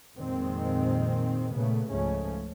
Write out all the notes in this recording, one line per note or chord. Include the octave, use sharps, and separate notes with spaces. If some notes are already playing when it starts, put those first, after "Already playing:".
F2 A#2 D#3 G#3 C4
A#2 C#3 A3 B3
C#2 G#2 C#3 F3 A3 C#4